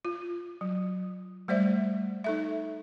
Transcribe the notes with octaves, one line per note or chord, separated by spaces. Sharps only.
F4
F#3
G3 A3 C5 D5 E5
D#4 A4 E5